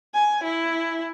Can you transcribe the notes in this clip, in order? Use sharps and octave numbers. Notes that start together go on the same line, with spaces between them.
G#5
E4